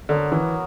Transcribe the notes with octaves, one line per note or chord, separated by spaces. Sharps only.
D3 F#3 B3 F#4 A#4
E3